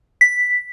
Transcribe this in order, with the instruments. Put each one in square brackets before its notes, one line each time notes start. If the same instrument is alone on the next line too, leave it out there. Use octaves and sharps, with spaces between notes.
[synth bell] B6